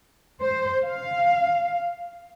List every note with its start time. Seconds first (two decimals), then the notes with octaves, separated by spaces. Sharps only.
0.41 C5
0.84 F5